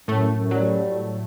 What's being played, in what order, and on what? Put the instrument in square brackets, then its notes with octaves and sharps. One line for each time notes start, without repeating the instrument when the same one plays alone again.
[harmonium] F#2 [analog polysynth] A2 A3
[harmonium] F#2
[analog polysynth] F#3 [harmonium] G3